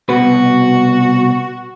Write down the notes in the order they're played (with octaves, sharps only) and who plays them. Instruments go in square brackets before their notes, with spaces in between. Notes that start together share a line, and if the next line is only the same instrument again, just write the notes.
[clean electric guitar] C2 B2 B4 [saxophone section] F#4